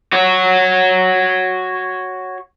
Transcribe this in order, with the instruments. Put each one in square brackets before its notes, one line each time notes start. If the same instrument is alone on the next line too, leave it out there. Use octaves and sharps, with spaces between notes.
[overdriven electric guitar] F#4 C#5